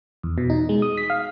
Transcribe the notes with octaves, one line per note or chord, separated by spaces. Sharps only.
E2
B2
D#4
G#3
D#6
B6
F5